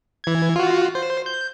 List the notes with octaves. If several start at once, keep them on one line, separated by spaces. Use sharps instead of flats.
E3 G#6
F4 F#4
C5
G6